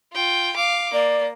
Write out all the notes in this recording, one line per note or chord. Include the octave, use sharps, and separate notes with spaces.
F4 G5
F5 D6
A#3 D5